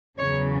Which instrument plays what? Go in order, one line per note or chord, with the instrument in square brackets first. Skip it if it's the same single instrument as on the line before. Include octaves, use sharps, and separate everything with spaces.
[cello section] E2 C#3 F#3 C#5